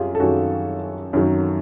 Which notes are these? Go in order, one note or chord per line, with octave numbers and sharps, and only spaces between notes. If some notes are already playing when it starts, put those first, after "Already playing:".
Already playing: F#2 F4 G4 G#4
A4
F#2 D#3 F#3 F#4 G#4
F#2 D#3 F#3